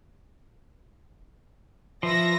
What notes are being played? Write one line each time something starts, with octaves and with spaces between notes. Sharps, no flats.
F3 B4 E5 A#6